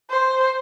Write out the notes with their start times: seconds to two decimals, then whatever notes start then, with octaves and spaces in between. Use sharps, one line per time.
0.10 C5